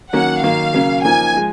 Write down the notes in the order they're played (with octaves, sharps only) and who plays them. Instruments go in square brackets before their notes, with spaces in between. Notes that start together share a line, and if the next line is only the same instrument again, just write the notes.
[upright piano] D#3 F#3 A#3 C#4 [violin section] F#5
[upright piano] D#3 F#3 A#3 [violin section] F5
[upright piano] C#3 F#3 A#3 C#4
[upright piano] F3 A#3 D#4 [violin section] G#5
[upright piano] F3 G#3